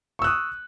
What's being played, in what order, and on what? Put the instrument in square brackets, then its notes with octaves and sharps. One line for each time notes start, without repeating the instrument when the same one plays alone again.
[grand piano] C#6
E6
F#6
D#6